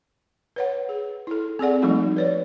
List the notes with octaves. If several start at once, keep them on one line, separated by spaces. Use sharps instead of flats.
B4 C#5 F#5
G#4
E4 A4
C4 G#4 A4 D5 F#5
F3 G3 A3 A#3 D#4 F#4
B4 C#5 D5